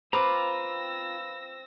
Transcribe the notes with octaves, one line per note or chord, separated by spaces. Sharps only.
C4 F4 B4 A#5 D6 E6 A#6